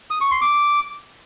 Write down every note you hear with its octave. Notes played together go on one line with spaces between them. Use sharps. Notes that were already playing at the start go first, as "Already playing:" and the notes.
D#6
C#6
C6
D6